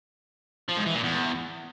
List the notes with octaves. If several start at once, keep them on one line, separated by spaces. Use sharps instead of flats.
F3
G#2
E3
A#2
E2